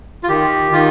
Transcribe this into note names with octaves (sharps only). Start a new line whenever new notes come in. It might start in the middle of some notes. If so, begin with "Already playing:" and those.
F4
D#3 G4
D#3 F4